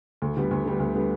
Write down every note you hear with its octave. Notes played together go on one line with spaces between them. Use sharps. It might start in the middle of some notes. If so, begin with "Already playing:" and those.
D2
D3 G3 B3
D2
D3 G3 B3
D2
D3 G3 B3